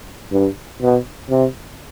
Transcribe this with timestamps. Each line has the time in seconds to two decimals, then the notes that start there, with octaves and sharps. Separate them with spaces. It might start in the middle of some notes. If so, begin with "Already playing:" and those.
0.32 G2
0.82 B2
1.30 C3